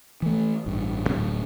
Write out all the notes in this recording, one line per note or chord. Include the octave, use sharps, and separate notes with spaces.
E3 A3
A1 G2
D1 A2 F#3 C#4